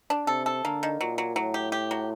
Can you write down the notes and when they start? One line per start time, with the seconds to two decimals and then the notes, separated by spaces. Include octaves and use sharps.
0.10 D4
0.27 C3 A4
0.46 A4
0.64 D3 A#3
0.83 D#3
1.00 A#2 F#3
1.18 F#3
1.36 A2 F#3
1.54 G4
1.72 G4
1.91 F#3